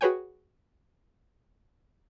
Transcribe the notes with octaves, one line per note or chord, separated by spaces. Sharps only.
F#4 G#4 B4 C#5 G5 G#5